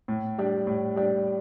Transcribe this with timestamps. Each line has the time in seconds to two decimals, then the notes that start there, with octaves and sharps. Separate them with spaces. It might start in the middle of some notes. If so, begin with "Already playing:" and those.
0.08 A2
0.38 G3 D4
0.67 A2
0.96 G3 D4